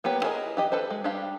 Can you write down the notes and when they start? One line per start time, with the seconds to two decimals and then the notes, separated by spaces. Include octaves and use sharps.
0.04 A#3 B3 G4 B4 C#5
0.23 E4 G#4 A#4 C#5 D#5
0.57 E3 G4 D#5
0.72 A4 B4 C5
0.90 G#3
1.04 G3 D4 G4 F5